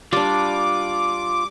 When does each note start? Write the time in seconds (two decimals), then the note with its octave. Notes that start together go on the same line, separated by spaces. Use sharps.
0.13 G3 D4 F4 D5 D6